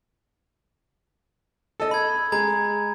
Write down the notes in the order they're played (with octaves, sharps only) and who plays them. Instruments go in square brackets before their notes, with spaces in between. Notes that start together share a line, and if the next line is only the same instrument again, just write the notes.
[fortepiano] A4 D#5
[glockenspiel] B5 G#6
[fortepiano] G#3 [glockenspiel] A#5 G#6